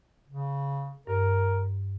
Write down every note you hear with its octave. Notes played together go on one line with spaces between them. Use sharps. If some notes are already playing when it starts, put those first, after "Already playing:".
C#3
G2 A#4